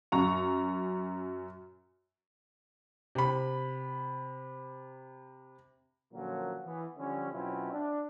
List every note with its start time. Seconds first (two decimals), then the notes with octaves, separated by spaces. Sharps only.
0.12 F#2 A#5 C#6
3.15 C3 B5
6.14 A#2 D3 F3 F#3 A#3 C#4
6.64 E3 B3
6.98 D3 F3 G3 C#4
7.32 B2 F#3 C4 C#4 E4 F4
7.72 D4